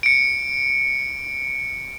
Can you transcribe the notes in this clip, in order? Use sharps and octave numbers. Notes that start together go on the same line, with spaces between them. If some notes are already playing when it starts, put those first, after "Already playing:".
C#7 D7